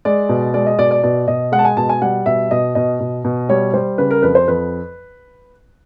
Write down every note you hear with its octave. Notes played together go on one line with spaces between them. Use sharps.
G#3 D5
B2
G#3 D5
D#5
B2 D5
D5
B2 D5
B2 D#5
G#3 F#5
A5
G#5
B2 A5
G#5
G3 F#5
B2 E5
B2 D#5
B2 D#5
B2
B2
G3 C#5
G3 C5
C#3 B4
A#4
F2 B4
C5
F2 B4